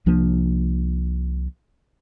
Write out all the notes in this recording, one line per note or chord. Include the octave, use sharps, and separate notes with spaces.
C2 F3 A#3 D4